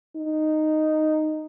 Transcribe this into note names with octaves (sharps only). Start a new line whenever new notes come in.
D#4